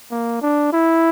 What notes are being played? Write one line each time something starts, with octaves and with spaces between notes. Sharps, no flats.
A#3
D4
E4